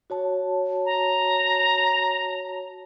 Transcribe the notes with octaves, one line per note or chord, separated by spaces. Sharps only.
F#4 C#5 A5
A#5